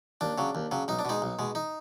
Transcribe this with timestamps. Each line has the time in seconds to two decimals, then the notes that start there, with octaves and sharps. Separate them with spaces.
0.21 D#2 D4
0.38 C#3 F#3
0.55 D#2
0.71 C#3 F#3
0.88 B1 D#4
0.99 D4
1.05 B2 G#3 D#4
1.22 B1
1.39 B2 G#3
1.55 D#4